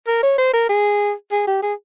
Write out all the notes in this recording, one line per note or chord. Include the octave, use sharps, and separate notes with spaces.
A#4
C#5
C5
A#4
G#4
G#4
G4
G#4